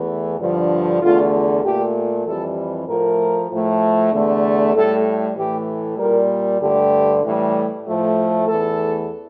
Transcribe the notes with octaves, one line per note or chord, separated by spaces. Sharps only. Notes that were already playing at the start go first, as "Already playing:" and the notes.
Already playing: E2 E3 A3
G2 D3 F3
E2 D3 A3 F4
A#2 A3 G4
F2 E3 G3 A4
A2 F3 A3 A#4
A2 F3 A3
E2 D3 A3
A2 G3 A4
A2 E3 A3 G4
A#2 G3 A#4
G2 D3 A3 G4
A2 E3 G3
A2 F3 A3
E2 E3 A3 A4